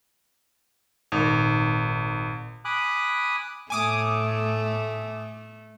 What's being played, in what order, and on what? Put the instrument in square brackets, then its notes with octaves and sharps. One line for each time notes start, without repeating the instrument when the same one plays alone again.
[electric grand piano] G#1 [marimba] A#2 D#4
[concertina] G#5 B5 D6 D#6 F#6
[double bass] A2 [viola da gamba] A3 [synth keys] G#5 D6 D#6